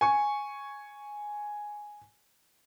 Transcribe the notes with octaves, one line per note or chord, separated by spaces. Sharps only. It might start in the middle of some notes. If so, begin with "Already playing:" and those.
G#5 C#6